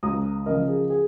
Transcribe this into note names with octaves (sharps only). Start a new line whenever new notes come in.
C#2 A#5 D#6
C#3 F3 A#4 D#5
G#4
G#4